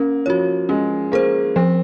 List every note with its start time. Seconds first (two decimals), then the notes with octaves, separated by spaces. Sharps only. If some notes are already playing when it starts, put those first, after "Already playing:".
Already playing: A#3 C#4
0.26 F3 F#4 C#5
0.69 G#3 C#4
1.12 A#3 G#4 C5
1.56 F3 C4